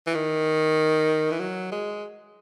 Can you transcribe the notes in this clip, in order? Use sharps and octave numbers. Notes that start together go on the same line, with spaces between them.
E3
D#3
E3
F#3
G#3